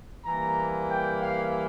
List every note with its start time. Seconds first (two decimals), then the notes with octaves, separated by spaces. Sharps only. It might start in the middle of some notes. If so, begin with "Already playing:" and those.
0.25 E3 G3 A#3 A#5
0.89 G5
1.20 F5